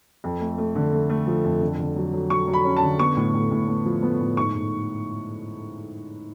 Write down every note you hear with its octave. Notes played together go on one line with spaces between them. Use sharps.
F2
A3
A3
D3
A3
A3
F3
F2
D3
D3
F#3
F#3
F#3 C#6
F#3
B5
C#4
A5
D3
B3 C#6
A2
A2
A2
B3
F3
B3
A2
G#2 C#6
G#2